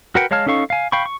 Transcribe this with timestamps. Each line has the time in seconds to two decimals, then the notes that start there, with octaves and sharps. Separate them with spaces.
0.15 F#4 A#4 B4 F#5 G5
0.31 G#3 C#5 F5 A5 F6
0.46 C#4 D#4 A4 F5 C#6
0.70 F5 G#5
0.92 F5 G5 B5 C#6
1.06 C#6